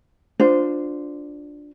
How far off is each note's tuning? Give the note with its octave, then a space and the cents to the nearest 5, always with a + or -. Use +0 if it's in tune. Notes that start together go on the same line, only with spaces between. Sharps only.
D4 +0 F4 +20 C5 -15